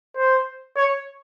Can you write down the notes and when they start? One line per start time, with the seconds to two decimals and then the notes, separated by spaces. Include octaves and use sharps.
0.17 C5
0.76 C#5